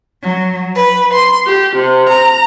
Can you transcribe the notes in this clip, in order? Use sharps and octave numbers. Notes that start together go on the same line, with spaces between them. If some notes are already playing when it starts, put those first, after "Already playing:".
F#3
B4
C6
G4
C3
A#5